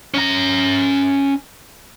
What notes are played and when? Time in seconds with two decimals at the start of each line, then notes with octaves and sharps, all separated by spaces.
0.14 C#4 A#5